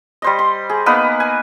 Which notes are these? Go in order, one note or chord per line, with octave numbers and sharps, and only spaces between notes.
G3 C5 D#5
C6
G#4
A#3 B3 D#4 B4
G#5